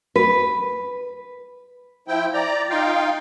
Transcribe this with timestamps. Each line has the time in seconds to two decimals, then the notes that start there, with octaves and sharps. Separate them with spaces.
0.16 B4
2.08 F3 E4 G5
2.34 D5 A#5
2.70 D#4 F4 F5 G5